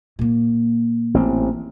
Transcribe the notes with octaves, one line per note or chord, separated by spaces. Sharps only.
A#2 A#3
A1 C4